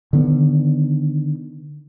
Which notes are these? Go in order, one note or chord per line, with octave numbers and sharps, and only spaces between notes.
D3 D#3 B3